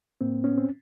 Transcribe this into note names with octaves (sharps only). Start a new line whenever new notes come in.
A2 A#3 C4
B3 C#4
C4